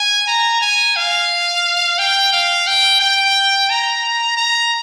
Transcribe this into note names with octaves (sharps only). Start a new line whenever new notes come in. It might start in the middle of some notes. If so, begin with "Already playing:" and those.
Already playing: G#5
A#5
G#5
F5
G5
F5
G5
G5
A#5
A#5